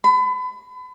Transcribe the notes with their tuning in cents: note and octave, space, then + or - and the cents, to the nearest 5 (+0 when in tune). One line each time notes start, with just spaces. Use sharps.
B5 +35